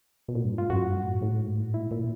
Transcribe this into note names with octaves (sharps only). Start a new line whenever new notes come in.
B2
A#2
G2
G#2
F4
F#2 F#4
G2
A2
A2
G#2
A2
A#2 E4
A#2